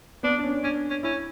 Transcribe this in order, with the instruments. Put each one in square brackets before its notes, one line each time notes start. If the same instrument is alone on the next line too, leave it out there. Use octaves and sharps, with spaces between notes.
[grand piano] B3 [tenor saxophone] D4
[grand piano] D4
C#4
[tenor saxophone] C#4 [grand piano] D4
[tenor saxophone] C#4
[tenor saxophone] C#4 [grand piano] E4